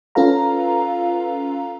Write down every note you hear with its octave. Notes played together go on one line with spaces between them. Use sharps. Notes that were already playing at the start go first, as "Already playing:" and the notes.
C#4 F4 A4 B4 F5 A#5